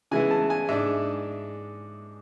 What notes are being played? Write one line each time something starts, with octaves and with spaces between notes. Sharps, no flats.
C#3 E3 G#3 B3 E4 G#5
A5
G#5
G#2 G#3 D4 E5